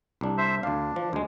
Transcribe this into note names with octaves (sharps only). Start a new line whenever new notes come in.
C2 D4
C5 E5
D2 D4 F5
F3
D2 G#3